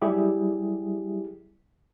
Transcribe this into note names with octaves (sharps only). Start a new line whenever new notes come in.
F#3 G3 E4 G4 G#4